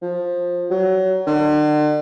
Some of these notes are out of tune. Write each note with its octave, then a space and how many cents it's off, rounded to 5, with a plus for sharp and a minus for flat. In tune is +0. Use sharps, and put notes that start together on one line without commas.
F3 +15
F#3 +25
D3 +45